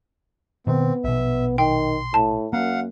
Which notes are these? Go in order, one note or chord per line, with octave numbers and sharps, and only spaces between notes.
B2 D#3 B3 C4
A#1 B2 E5
D#3 G5 C6
A2 A5
F#2 A#3 F5 F#5